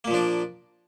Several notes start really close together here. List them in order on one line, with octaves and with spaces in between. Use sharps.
A#3 A#2 F3 D4